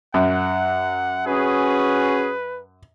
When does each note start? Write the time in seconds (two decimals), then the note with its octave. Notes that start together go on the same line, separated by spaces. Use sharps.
0.14 F#2 F#5
1.27 C#4 F#4 G#4 B4